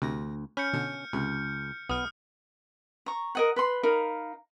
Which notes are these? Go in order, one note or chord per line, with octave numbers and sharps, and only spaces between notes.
D2 C3 A#6
C#4 B5 F6 G6 C#7
B2 D3
C#2 C3
B1 B3 D#6 F6
A#5 C#6
A#4 D#5 F#5
B4 B5 C6
D#4 A#4 F5 B5